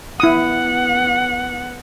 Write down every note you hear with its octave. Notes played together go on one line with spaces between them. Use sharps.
B3 E4 F#5 D#6